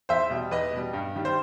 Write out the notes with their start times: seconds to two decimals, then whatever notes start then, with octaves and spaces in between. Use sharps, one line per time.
0.09 E2 C5 E5
0.30 B2 G3
0.51 E2 B4 D#5
0.73 B2 G3
0.93 G2
1.16 D#3 G3
1.25 C5